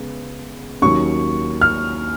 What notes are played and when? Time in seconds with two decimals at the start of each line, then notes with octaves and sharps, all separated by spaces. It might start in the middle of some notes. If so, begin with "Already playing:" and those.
Already playing: C#3 G#3 B3
0.82 D#2 D#3 F#3 C#4 C#6
1.61 F6